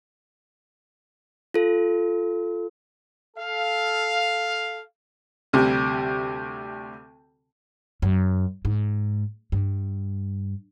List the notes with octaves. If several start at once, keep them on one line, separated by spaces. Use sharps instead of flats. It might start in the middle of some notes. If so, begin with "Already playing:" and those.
F4 A4
A4 F5
D2 C3 G3
F#2
G#2
G2